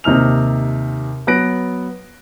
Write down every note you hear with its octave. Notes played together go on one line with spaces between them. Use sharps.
D#2 C3 D#4 F6 F7
F#3 B3 F#6 A#6 D7